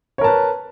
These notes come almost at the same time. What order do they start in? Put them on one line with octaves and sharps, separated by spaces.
C#5 A#4 A5 B4